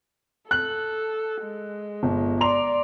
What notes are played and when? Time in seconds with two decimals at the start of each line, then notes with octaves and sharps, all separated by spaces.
0.51 A4 F#6 F#7
1.43 G#3
2.03 G1
2.41 D5 A#5 C6 F7